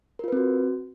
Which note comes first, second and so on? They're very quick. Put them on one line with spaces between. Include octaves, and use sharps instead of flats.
A#4 F4 B4 C4 F#4